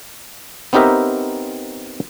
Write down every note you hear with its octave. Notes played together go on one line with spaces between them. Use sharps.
B3 C4 D#4 G4 A#4 E5